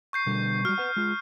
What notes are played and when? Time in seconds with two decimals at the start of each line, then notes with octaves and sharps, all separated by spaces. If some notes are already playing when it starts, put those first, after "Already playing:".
0.13 C#6 G6 C7
0.26 B2 D3 G3
0.65 G3 F#4 F6
0.78 B4 F#5
0.96 G#3 F4